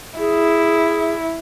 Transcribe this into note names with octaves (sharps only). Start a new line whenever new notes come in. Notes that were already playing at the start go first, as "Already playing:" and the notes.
E4 G#4